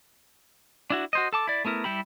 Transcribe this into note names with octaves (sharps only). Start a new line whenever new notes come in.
D4 E4 F#4
F#4 C5 D#5
A4 A5 D6
E4 D5
A3 B3 E4 A#4
G3 E4 G4 B5